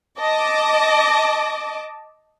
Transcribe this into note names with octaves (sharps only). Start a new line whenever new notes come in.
D#5 A5 D6